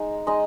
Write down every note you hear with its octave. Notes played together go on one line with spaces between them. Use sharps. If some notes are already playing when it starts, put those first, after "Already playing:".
Already playing: G#3 D#4
G#3 D#4 D#5